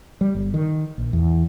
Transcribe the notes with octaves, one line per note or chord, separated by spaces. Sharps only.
G3
G1
D#3
A#1
E2